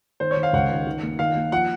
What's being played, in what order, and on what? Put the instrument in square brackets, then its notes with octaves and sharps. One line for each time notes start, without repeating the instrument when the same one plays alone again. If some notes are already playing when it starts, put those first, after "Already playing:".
[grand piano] D#3 [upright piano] C5
[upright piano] C#5
[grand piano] D#3
[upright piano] F5
[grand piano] C#2 [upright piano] F#5
[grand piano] D#3
D#3
A#3
[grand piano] D#3 [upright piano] F5
[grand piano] A#3
[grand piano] F3 [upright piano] F#5